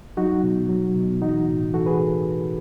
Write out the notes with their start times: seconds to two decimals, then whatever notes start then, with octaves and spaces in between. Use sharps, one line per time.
0.17 F#3 D#4 F#4
0.43 B2
0.69 F#3
0.95 B2
1.22 E3 D#4 F#4
1.48 A2
1.74 E3 F#4 A4
1.86 G#4 B4